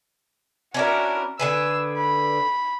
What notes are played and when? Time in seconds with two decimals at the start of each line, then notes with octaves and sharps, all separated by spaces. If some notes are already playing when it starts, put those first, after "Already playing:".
0.74 C#4 D4 E4 F#4 A#4
1.39 D3 G#4 B4 E6
1.97 B5